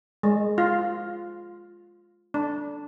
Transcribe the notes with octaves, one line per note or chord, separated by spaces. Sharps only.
G#3
F4
D4